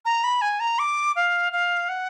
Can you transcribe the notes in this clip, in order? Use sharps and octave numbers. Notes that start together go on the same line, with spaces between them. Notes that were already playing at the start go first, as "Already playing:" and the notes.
A#5
B5
G#5
A#5
D6
F5
F5
F#5